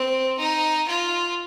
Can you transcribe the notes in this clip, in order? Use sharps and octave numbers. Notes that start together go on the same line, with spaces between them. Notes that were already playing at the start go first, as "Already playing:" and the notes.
Already playing: C4
D#4
F4